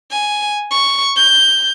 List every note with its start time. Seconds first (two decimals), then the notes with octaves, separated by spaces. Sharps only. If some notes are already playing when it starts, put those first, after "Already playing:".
0.11 G#5
0.71 C#6
1.16 G6